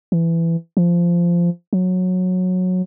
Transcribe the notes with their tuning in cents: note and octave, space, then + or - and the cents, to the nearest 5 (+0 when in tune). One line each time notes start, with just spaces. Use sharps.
E3 +15
F3 -15
F#3 -15